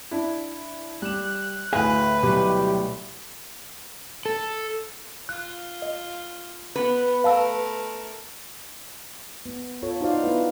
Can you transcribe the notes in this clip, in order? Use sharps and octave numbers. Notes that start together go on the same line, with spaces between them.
D4 E4
G3 F#6 E7
D2 A2 G#4 B4 F5 G#5
B2 F#3 G3 G4
A4
F4 F#6
D#5
B3 B4
A3 A#4 F5 A5 E6
B3
F4 A4 C#5
D#4 F4 F#4 C5 D5 F5
B3 E4 B4